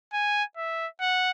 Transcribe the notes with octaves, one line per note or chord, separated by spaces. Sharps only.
G#5
E5
F#5